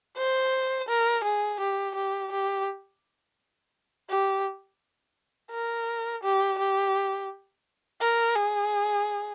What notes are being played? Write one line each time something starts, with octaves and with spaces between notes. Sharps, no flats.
C5
A#4
G#4
G4
G4
G4
G4
A#4
G4
G4
A#4
G#4